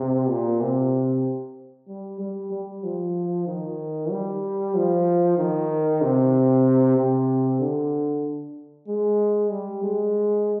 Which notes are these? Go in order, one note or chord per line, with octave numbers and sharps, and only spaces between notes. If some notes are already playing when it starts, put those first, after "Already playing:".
Already playing: C3
A#2
C3
G3
G3
G3
F3
D#3
G3
F3
D#3
C3
C3
D3
G#3
G3
G#3